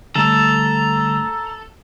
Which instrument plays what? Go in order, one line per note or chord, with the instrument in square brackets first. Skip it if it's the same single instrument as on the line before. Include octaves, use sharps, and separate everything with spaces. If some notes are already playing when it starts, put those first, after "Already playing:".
[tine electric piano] D3 G3 A3 [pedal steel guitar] A4 [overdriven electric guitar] A#5